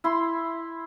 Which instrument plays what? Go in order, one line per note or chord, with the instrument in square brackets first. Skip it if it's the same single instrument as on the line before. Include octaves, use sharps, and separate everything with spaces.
[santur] E4 B5 C6